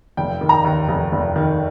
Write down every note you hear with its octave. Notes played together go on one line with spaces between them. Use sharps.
F1 G5
D#3
A#5
D#2
F1
F1
D#3